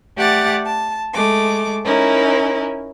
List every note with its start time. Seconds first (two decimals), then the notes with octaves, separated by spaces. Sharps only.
0.15 A3 G4 D5 F#5 A6
0.65 A5
1.14 G#3 A3 D6
1.83 C#4 D#4 E4 A#4